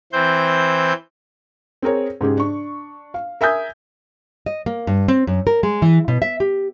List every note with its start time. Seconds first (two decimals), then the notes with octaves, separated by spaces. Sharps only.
0.13 E3 C4 C5 G6
1.82 C4 G#4 A#4 C#5
2.21 G#2 C#3 G4 G#4
2.37 D4 C#6
3.14 F5
3.41 A#4 E5 G#5 D#6 G6
4.46 D#5
4.66 A#3
4.87 G2
5.08 C4
5.27 F#2
5.47 A#4
5.63 G#3
5.82 E3
6.08 B2
6.22 E5
6.40 G4